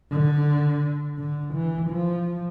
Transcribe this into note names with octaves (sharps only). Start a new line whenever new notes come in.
D3
D3
E3
F3